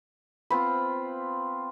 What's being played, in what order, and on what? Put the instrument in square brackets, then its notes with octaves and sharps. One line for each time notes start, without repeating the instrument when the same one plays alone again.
[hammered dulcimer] B3 C4 F4 [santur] B5